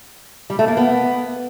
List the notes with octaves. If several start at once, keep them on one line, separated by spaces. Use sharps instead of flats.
G3
A3
A#3
B3